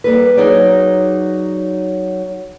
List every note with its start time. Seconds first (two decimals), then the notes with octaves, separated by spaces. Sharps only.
0.04 G3 A#3 A4 B4
0.37 F#3 D#4 G#4 C#5 D5